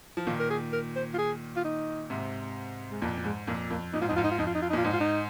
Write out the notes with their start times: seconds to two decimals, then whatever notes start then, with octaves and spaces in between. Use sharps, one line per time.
0.17 F3
0.27 A#2 D#3 F4
0.39 A#4
0.50 G#4
0.73 A#4
0.96 C5
1.14 F4
1.18 G#4
1.56 F4
1.64 D#4
2.10 G#2 C3
2.91 G#3
3.02 F2 A#2 A#3
3.18 A#2
3.24 G#2 G#3
3.47 F2 A#2 A#3
3.70 F2 A#3
3.93 A#2 D#4
4.01 G#2 F4
4.08 F2 D#4
4.16 G#2 F4
4.24 D#4
4.31 F4
4.38 F2 D#4
4.47 F4
4.55 D#4
4.62 F4
4.70 D#4
4.73 A#2 F4
4.85 G#2 D#4
4.93 F4
5.00 D#4